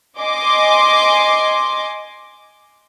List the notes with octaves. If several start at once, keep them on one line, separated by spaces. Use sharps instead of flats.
D#5 G#5 C6 D6